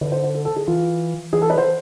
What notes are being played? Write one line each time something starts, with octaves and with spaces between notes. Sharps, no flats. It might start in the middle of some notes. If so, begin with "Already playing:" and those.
D3 B4
C5
C5
A4
A4
G#4
E3 F4
E3 G#4
A4
B4
C5